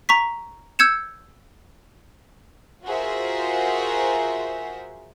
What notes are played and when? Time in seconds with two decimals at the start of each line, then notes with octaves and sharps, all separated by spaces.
0.09 A#5 C#6 B6
0.79 E6 G6 G#6 C#7 E7
2.85 F4 F#4 G#4 A#4 C5 E5